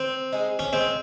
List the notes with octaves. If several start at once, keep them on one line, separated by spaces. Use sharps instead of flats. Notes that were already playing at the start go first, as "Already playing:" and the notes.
Already playing: C4
G#3 D#4 G#4
C#4
G#3 C4